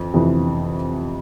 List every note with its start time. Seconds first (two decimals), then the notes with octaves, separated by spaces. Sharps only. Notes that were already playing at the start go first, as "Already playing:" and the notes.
Already playing: F2 E3
0.14 F2 C3 E3